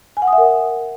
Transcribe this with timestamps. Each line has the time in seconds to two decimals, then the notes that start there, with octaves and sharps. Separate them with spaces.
0.17 G#5
0.22 F#5
0.27 D#6
0.33 E5
0.38 A#4